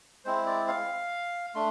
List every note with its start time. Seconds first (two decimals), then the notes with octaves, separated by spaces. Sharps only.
0.25 G#3 C4 E4 C5
0.47 D5
0.68 F5
1.55 A3 D4 C6